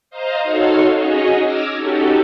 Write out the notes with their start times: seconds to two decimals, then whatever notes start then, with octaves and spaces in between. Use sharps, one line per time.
0.10 C5 D#5 F5 A#5
0.43 D#4 F#4 A4 C#5 F5 C6
0.93 C#4 D#4 F#4 G#4 C#5 D#5
1.41 D6 E6 F6 G#6 A#6
1.75 C#4 D#4 F#4 G4 A4